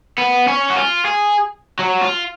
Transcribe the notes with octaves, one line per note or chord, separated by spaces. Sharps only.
B3
C#4
F#4
F4
G#4
F#3
F4